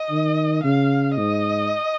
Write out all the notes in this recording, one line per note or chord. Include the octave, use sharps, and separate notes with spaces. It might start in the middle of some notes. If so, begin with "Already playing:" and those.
Already playing: D#5
D#3
C#3 F5
G#2 D#5